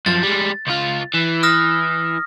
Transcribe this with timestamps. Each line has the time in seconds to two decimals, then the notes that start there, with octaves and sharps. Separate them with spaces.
0.06 F#2 F3 A6
0.23 G3 G#3
0.67 C#2 F4
1.14 E3
1.43 D#6 F6 A#6